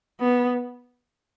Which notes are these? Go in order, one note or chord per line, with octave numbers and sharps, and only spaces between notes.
B3